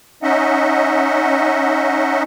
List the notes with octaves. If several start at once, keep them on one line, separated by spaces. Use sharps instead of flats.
C#4 D#4 D#5 E5 F#5